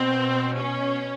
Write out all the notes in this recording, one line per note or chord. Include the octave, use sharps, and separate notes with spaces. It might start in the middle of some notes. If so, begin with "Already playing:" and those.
Already playing: B2 C4
C#4